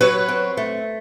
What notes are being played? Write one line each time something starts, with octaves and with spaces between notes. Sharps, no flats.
F#3 B4 C#5
C4
A3